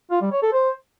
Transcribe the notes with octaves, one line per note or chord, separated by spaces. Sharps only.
F4
G3
C#5
A4
C5